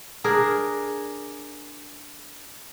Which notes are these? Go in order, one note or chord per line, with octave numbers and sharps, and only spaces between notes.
D4 G#4 A#4